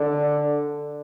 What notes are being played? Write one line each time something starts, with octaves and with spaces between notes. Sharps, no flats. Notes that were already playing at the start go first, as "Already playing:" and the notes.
Already playing: D3